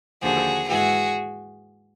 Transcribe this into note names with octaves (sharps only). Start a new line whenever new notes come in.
D#2 D3 F3 F#4 G#4
G#2 E3 F#4 G#4